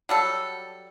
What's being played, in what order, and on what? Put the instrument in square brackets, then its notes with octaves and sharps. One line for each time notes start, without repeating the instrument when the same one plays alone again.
[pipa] F#3 G3 A4